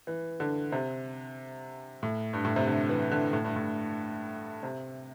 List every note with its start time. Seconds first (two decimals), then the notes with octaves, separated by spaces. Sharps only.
0.07 E3
0.40 D3
0.72 C3
2.03 A2
2.33 G2
2.45 A2
2.56 C3
2.67 D3
2.89 E3
3.11 D3
3.33 A2
3.44 G2
3.56 A2
4.63 C3